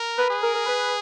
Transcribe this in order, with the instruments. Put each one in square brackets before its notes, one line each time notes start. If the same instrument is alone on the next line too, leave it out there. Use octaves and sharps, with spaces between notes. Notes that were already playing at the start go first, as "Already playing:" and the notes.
Already playing: [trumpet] A#4
[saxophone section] B4
[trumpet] G#4
[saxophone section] A#4
A#4
B4